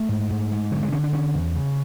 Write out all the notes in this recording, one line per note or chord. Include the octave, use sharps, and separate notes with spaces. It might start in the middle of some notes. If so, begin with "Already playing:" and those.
Already playing: A3
G#2
G#2
G#2
D3 F#3
G#3
D3 C#4
D4
D3 C#4
E2
C#3